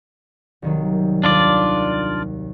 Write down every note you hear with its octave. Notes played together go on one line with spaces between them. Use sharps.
C2 D#3 F#3
D#2 D4 F4 D5